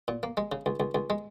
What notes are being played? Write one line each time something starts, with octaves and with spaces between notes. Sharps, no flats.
A#2
A#3
G#3
C#3
C#2
C#2
C#2
G#3